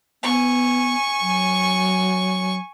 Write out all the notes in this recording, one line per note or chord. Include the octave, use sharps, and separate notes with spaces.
B3 G#5 C#6
F#3